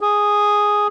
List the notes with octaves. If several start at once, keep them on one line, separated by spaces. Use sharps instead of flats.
G#4